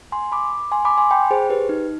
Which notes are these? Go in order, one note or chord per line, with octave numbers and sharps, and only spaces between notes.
G#5 C6
B5 D6
G#5 C6
B5 D6
G#5 C6
G5 B5
G#4 C5
G4 B4
D#4